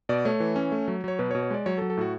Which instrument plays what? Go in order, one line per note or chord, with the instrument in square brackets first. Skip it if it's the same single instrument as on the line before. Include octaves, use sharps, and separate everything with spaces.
[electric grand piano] B2 D5
A3 C#5
E3
C#4
A3
F#3
F#3 C#5
B2 B4
C#5
B2
C#5
G#3 D5
F#3 C#5
A4
F#3
A4
A2 F#4